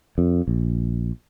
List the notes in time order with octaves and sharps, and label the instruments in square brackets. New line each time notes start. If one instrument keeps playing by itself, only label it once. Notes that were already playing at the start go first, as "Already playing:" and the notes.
[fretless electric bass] F2
A#1